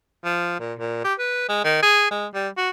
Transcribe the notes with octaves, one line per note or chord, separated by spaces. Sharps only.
F3
A#2
A#2
G4
B4
G#3
D#3
G#4
G#3
G3
F#4